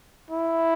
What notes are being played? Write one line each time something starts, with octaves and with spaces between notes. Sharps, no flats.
E4